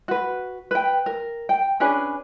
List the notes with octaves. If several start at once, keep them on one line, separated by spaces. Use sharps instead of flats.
F#4 B4
B4 G5
A#4
G5
C#4 D4 G#4 B4